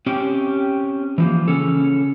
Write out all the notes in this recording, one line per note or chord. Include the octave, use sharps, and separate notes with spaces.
C4 C#4 G4
E3 F3 A#3
C#3 C#4 A4